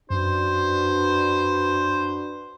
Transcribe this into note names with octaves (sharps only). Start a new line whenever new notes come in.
F#2 D4 F#4 B4 C5